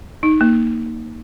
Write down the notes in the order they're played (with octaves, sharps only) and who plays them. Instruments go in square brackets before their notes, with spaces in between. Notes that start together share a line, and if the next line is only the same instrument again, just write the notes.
[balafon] D#4
A#3